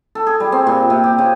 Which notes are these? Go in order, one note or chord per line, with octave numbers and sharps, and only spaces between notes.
A4
G#4
G3
C4
A#2
C3
G4
C#3